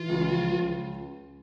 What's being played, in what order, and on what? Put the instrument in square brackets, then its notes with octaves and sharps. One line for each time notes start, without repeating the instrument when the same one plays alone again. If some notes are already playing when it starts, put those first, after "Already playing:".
Already playing: [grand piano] E3 [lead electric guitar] F4
[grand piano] C#2
F3
C#2